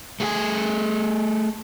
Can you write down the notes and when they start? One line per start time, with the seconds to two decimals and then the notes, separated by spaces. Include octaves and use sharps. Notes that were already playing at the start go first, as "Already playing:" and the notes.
0.20 A3 G#4 G5 G#5